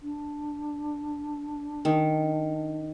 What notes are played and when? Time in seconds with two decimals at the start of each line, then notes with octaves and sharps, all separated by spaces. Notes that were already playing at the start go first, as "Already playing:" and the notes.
0.01 D4
1.85 D#3